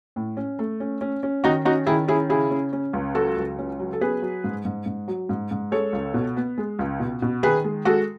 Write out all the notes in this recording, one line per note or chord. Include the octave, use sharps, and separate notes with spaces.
A2
C#4
A3
C#4
C#4
C#4
D#3 D#4 F#4
C#4 D#4 F#4
D#3 E4 G#4
C#4 E4 G#4
C#3 E4 G#4
C#4
C#4
C#2
F#3 F#4 A4
C#2
C#4
F#3
A4
B3 G#4 B4
F#3
G#2
G#2
G#2
F#3
G#2
G#2
G#3 A4 C#5
C#2
B2
B3
G#3
C#2
B2
B2
D#3 G#4 B4
G#3
G#3 F#4 A4